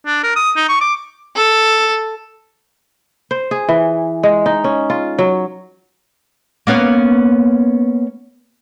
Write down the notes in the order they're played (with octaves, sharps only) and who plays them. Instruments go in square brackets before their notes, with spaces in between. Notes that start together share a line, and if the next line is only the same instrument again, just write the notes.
[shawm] D4
A#4
D#6
D#4
C#6
D6
[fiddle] A4
[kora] C5
G#4
E3
G#3
D#4
C#4
F4
F#3
[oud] A#3 B3 C#4